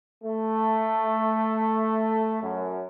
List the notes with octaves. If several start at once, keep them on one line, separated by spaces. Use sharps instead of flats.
A3
F#2